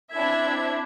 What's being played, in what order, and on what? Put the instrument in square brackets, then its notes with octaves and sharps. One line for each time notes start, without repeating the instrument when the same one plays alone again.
[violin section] C4 D4 E4 E5 G#6